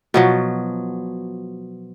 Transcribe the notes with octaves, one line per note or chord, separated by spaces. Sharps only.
B2 F3 F#3